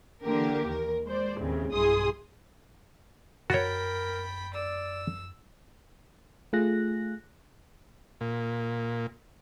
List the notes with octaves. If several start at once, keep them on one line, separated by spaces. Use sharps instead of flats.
D3 E3 A#3 G4 A#4
D#2 A#4
G#3 C5 D5
D#2 A2 C#3 C4
B1 G2 E4 G#4 C6 D#6
F#2 F#4 A#4 C#5 G5 B5 A6
D5 E6
A3 F4 G#4 F#6 A#6
A#2